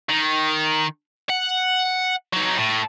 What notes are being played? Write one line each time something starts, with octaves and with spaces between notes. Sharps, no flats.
D#3
F#5
F#3 D#4
A2